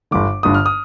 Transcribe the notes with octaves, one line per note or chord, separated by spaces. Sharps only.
G1 G2 D3 D6
G1 G2 D3 D#6
F6
D#6